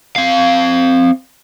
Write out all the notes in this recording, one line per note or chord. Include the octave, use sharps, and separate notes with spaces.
C4 F5